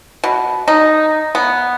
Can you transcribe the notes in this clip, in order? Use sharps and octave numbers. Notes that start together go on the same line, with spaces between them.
B2
D#4
B3